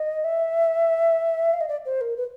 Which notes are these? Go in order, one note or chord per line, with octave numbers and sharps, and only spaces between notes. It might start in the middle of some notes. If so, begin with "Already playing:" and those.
Already playing: D#5
E5
F5
D#5
D5
C5
A#4
B4